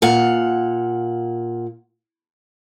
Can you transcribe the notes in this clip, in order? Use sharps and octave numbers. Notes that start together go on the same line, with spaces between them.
A#2 F5 F#5